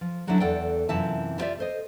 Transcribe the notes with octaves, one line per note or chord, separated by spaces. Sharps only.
F3
D3 F#3 G3 C#4 D4 E4
E2 A4 D5 F#5 G5
F#2 C3 E3 F4 E5 A5
E4 F4 G4 C#5 D5 E5
A4 C5 D#5